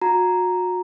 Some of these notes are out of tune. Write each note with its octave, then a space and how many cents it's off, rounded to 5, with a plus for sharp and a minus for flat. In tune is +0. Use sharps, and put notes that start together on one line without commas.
F#4 -35 A#5 +0